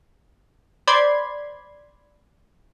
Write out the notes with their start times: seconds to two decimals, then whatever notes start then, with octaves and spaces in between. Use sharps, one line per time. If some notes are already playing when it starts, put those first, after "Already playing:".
0.87 C5 D5 B5 C6 G#6